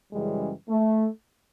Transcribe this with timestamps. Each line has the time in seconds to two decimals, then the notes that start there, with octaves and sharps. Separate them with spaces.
0.13 F#2 C#3 E3 G3 G#3
0.69 A3